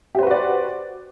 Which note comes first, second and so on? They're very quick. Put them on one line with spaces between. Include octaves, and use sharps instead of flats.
G4 C5 B4 F#4 D5